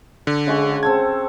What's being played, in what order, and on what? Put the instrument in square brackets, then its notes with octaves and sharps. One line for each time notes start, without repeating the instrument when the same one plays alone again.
[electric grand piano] D3
[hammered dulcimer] C#3 G#3 F#4
[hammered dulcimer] C4 A4 A5 [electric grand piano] G#6